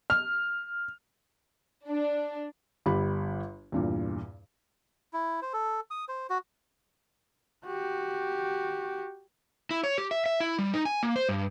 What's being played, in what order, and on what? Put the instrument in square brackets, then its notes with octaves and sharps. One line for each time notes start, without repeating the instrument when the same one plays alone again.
[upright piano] F6
[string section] D4
[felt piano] G1 G3 G4 B5
E2 G2 A#2
[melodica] E4
C5
A4
D#6
C5
F#4
[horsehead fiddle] F#4 G4
[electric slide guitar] E4
C#5
G4
E5
E5
E4
G3
D#4
G#5
A#3
C5
G2